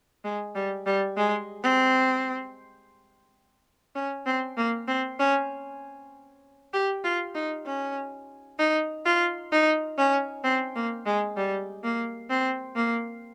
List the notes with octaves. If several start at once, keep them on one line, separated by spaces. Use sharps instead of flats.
G#3
G3
G3
G#3
C4
C#4
C4
A#3
C4
C#4
G4
F4
D#4
C#4
D#4
F4
D#4
C#4
C4
A#3
G#3
G3
A#3
C4
A#3